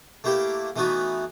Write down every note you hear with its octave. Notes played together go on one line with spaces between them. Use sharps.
A3 A#3 E4 G4 G5
E3 A3 B3 D#4 F#4